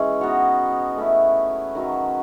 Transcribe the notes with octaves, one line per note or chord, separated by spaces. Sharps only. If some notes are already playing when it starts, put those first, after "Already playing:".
Already playing: E3 G#3 C#4
B3 D#4 F#4 C#5
A3 C#4 E4
D#3 F#3 C#4